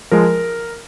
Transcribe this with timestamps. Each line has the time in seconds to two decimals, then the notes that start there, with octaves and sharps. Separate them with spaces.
0.11 F3 G#3 A#4